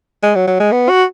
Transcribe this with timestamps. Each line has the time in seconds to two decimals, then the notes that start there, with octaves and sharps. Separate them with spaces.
0.23 G#3
0.35 F#3
0.47 F#3
0.60 G#3
0.72 B3
0.89 F#4